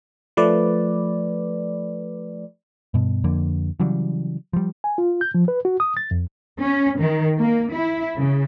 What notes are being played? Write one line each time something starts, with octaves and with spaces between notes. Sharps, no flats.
F3 A3 B4 D5
G2 B2
F2 D3 A#3
C#3 E3 F#3 G3
F3 G3
G#5
F4
G6
F3
B4
F#4
D#6
A6
F2
C#4
D#3
A#3
E4
C#3